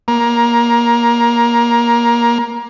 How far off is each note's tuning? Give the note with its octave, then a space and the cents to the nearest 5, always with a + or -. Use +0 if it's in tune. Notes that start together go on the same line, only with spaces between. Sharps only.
A#3 +20